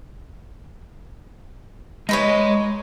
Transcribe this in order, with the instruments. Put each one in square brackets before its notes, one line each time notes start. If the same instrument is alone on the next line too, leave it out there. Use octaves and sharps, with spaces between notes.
[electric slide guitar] G#3 D#5 [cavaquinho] D#4 B4 C#5